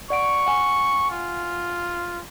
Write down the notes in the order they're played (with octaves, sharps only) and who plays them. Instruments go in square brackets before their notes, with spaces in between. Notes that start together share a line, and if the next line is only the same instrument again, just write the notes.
[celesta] D5 F#5 D7 [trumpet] C#6
[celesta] F#5 G#5
[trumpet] F4